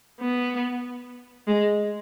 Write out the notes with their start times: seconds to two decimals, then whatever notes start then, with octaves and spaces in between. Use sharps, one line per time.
0.20 B3
1.47 G#3